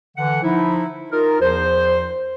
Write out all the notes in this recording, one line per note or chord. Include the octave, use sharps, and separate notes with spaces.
D3 E3 F#5
F3 D#4 E4
D#4 F4 A#4
E2 F3 C5